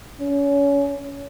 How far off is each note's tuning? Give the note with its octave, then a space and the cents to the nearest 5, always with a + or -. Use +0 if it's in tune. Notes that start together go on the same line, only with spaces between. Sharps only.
C#4 +30